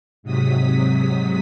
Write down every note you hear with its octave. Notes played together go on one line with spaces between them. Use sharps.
G#2 C3 F#3 D#6 B6